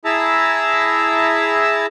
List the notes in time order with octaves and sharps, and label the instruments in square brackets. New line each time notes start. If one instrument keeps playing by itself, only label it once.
[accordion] E4 G#4 E5 A5 A#5 E6